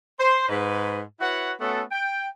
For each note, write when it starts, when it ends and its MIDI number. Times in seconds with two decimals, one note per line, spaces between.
0.19 0.48 72
0.49 1.01 44
0.49 1.01 71
1.20 1.53 64
1.20 1.53 66
1.20 1.53 71
1.20 1.53 73
1.20 1.53 78
1.61 1.83 57
1.61 1.83 59
1.61 1.83 61
1.61 1.83 66
1.61 1.83 69
1.61 1.83 78
1.91 2.28 79